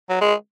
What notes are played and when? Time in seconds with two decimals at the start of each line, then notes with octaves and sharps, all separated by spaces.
0.09 F#3
0.21 G#3